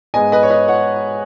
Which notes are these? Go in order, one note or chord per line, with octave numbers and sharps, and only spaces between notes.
G#2 G#3 B3 D#5 G#5
B4 D#5
C#5
B4 D#5
C#5 F#5